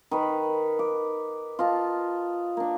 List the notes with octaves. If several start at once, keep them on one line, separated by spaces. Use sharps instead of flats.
D#3 B4
D6
F4 D#5 A5
A#3 D4